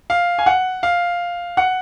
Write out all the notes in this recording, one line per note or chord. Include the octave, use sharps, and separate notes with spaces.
F5
G#5
F#5
F5
F#5